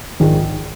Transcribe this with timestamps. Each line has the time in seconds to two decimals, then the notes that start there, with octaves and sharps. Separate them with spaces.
0.20 A#1 G#2 D#3 G#3